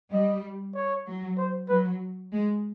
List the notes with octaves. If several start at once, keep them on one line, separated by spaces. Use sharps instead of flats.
G3 D#5
C#5
F#3
C5
F#3 B4
G#3